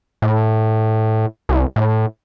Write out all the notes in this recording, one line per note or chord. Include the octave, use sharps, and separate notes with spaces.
A2
C2
A2